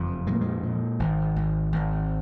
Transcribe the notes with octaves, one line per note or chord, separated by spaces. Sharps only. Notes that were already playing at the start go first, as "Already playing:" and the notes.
Already playing: F#1 F2
A#2 G#3
A#3
G#3
A#2
G#1
G#1
G#1